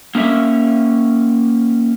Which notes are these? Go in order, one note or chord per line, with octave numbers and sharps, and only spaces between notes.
A#3 C#4 A#4 E5